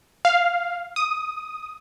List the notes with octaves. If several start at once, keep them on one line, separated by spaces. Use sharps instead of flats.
F5
D#6